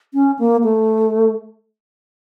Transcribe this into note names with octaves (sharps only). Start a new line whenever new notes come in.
C#4
A#3
A3